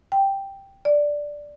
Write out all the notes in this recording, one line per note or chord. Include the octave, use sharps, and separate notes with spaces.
G5
D5